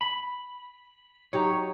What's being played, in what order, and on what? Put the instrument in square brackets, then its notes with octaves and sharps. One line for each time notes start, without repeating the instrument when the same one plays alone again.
[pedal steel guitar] B5
[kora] F#3 D#4 G4 [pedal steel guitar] C#5